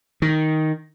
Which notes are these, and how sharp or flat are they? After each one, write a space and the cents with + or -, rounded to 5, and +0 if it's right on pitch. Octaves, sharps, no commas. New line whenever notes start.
D#3 +5